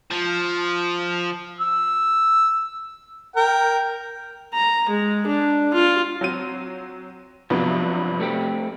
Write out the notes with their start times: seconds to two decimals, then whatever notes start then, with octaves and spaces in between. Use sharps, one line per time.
0.11 F3
1.61 E6
3.36 A#4 G5
4.54 A#5
4.90 G#3
5.27 D4
5.74 F4
6.21 F#3 C4 D#7
7.50 G2 C3 F3 F#3 B3
8.20 A3 C4 G4